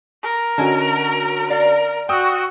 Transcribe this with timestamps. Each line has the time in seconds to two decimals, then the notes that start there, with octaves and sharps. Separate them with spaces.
0.23 A#4
0.58 D3 C#4 F#4 D#5 G#5 A5
1.50 A#4 D5 F5
2.09 F#4 G5 D#6 E6